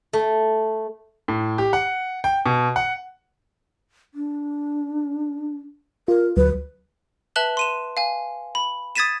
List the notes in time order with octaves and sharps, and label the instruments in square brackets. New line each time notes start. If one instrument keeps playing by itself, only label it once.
[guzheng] A3
[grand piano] A2
G4
F#5
G5
B2
F#5
[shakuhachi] D4
[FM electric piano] F4 [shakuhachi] A#4
[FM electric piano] D2 F#3 [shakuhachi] B4
[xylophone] B4 E5 A5 F#6 F#7 G7
C6 D#7 E7
F5 G#5
B5
D#6 G#6 A6 B6 D#7 E7